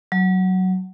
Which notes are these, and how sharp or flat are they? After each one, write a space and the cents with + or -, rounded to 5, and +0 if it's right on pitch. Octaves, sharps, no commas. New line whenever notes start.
F#3 +10